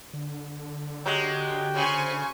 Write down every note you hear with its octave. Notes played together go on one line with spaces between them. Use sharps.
D3
F#3 G#3 G4 G5
C#3 C5 G#5 C#6